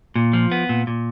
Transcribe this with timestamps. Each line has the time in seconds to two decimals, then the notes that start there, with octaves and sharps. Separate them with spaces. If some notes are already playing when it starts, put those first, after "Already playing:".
0.16 A#2
0.33 F3
0.52 B3
0.69 A#2
0.87 A#2